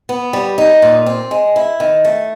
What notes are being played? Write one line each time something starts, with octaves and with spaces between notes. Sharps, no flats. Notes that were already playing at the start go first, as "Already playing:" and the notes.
B3
G3
D#4
A#2
C4
G#3
E4
D#3
A3